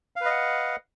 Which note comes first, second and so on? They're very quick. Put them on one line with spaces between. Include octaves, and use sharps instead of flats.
F5 B4 D#5 F#5